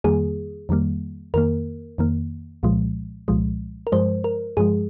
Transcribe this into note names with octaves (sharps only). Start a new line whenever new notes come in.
F2 D#3 G3 A#3 G#4
F2 D#3 G3 A#3
F2 D#3 A#3 A#4
F2 D#3 A#3
C2 A#2 F3 G#3
C2 A#2 F3 G#3
A#4
G2 F3 G#3 C5
A#4
G2 F3 G#3 G#4